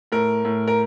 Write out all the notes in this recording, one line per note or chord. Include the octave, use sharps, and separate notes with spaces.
A2 A#4
A2
A#4